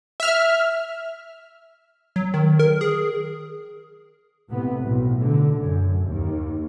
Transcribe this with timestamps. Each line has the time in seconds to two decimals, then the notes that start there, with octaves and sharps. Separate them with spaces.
0.20 E5 F6
2.16 F#3
2.34 D#3
2.59 A#4
2.81 G#4
4.49 A2 C3 B3
4.82 B1 A2
5.22 D3
5.58 F#2
6.06 D#2